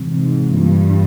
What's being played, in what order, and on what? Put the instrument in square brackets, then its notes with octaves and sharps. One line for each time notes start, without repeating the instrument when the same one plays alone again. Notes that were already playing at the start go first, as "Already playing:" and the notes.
Already playing: [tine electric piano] C3 E3 G#3 C4
[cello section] G#2
[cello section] G2 [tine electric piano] E3 A#3 F4